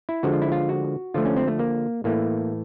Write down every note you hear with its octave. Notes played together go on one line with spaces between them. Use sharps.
E4
D3 F3 G#3 F#4
F4
E4
F4
F#4
D3 F3 A3 F4
C#4
C4
A3
A#3
A2 E3 A3 A#3